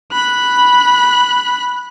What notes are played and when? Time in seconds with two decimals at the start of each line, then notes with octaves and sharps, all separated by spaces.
0.12 B5 F#6